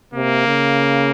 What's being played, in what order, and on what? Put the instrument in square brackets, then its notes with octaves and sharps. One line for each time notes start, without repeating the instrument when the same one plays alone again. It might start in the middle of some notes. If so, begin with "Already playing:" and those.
[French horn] C3 [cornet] A#3
[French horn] C#3